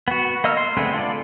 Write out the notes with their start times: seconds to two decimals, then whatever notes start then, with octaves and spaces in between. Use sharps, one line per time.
0.08 B3 F#4
0.44 A#3 D#5 E6 F6
0.57 C6
0.77 D3 G#3 A3 B3 C4
0.94 F4 A4 D5